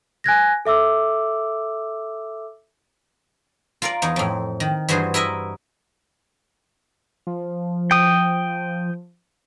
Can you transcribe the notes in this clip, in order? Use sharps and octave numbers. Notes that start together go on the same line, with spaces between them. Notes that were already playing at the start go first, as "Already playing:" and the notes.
G#5 F#6 G#6 A#6
A4 E5 D6 E6
F4 A#4 D5
E2 D#4
F2 A2
D#3
G2 E3 F#4 G#4 C5
E4 A#4 D#5 E5
F3
G5 D#6